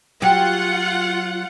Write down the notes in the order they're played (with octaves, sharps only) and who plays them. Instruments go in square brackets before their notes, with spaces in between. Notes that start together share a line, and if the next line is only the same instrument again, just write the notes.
[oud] F#3 G4 [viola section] F4 F#5